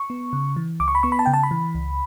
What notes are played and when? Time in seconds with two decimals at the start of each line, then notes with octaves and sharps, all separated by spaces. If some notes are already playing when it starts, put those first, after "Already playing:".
Already playing: C#6
0.10 B3
0.33 C#3
0.56 E3
0.80 C#2 D6
0.88 C#6
0.95 B5
1.03 B3 C#6
1.12 B5
1.19 A5
1.26 C#3 G5
1.34 A5
1.43 B5
1.51 E3
1.75 C#2